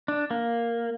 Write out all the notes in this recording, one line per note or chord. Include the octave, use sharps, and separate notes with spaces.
D4
A#3